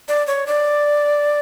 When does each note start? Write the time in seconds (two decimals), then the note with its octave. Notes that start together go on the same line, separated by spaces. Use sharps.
0.08 D5
0.27 C#5
0.47 D5